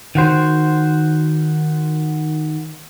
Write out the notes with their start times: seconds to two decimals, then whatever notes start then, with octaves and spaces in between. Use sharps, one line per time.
0.15 D#3 F#4 C5